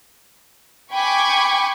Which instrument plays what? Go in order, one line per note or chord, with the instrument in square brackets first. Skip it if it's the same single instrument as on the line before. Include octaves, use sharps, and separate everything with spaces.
[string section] G5 G#5 B5 C#6 D6